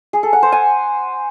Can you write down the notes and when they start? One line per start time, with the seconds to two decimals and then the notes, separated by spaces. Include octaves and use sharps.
0.13 G#4
0.23 A4
0.33 F#5
0.43 C5
0.52 G#5